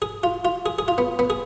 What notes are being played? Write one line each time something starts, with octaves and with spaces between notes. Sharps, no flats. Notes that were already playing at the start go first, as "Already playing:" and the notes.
G#4
F4
F4
G#4
G#4
F4
B3
B3
G#4